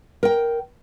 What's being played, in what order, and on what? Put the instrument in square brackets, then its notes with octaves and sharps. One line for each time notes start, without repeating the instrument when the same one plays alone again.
[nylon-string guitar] A#4 G5